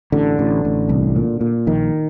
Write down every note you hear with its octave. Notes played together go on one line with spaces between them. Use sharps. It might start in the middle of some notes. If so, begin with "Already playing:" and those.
A1 D3
A1
A1
C2
A#2
A#2
A#1 D#3